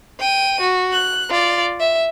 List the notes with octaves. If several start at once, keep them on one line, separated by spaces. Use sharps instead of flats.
G5 D#7
F#4
F#6
F4 D5
E5